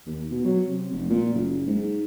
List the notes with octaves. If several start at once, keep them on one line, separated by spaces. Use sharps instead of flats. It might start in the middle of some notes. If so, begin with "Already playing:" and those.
D#2
B2
F#3
C3
F1
A#2
F#1
G#2